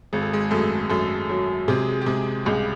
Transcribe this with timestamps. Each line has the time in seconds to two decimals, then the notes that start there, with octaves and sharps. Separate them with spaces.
0.13 G#1 G#4
0.22 A4
0.33 G#3 G#4
0.51 F#2 A3 A4
0.90 F#2 A3 A4
1.30 F#3
1.68 C3 G#3 G#4
2.01 G4
2.06 C3 G#3 G#4
2.45 C#2 G3 G4